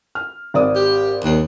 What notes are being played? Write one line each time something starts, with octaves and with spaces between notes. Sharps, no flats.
F6
G#1 D5 D#6
G4
D#2